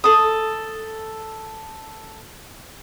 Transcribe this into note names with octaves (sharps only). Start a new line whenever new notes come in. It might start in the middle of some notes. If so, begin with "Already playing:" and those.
A4 D#6